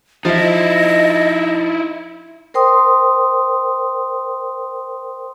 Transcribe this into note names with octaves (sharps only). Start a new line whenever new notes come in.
F3 D#4 E4 D#5 E5
A#4 C5 G5 C6 D#6